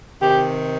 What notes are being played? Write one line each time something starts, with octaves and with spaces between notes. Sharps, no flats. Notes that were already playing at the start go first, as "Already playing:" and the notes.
C3 D#3 G4